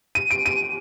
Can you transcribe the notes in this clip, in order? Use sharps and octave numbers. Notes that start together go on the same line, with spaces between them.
D#7
D7
D#7